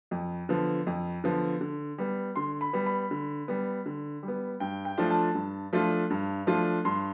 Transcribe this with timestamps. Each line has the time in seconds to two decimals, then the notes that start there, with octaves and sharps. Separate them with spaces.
0.11 F2
0.49 D3 F3 B3
0.87 F2
1.24 D3 F3 B3
1.61 D3
1.98 G3 B3
2.36 D3 C6
2.61 B5
2.73 G3 B3
2.86 B5
3.11 D3
3.48 G3 B3
3.86 D3
4.23 G3
4.28 B3
4.60 G2 G5
4.85 G5
4.98 F3 A3 D4 F4
5.11 A5
5.35 G2
5.73 F3 A3 D4 F4
6.10 G2
6.47 F3 A3 D4 F4
6.85 G2 C6